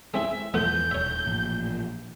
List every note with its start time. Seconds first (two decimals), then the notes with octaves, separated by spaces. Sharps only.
0.14 G#3 C4 E4 E5
0.54 E2 F3 A3 B3 G6
0.91 D#1 C#5 E5
1.26 A1 A#2 F3